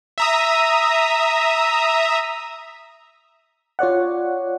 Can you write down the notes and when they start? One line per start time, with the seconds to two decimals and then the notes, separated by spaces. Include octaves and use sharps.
0.18 E5 A#5 D#6
3.79 F4 C#5 D5 F#5